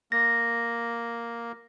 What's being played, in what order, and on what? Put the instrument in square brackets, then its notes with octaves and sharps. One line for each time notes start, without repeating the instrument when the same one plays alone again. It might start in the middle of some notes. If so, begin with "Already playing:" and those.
[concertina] A#3 [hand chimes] A#6